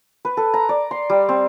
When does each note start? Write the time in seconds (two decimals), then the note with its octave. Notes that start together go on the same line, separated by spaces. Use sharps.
0.25 B4
0.37 A4
0.54 A#5
0.69 D5
0.91 C6
1.10 G3
1.29 C4